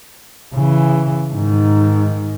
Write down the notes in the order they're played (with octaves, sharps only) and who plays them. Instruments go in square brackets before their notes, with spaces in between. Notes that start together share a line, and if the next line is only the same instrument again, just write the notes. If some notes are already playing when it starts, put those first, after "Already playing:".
[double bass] C#3 E3
G#2 D#3